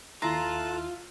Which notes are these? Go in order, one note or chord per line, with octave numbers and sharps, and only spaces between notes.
D#2 E4 F4 A4 A5 A#5 C6 F#6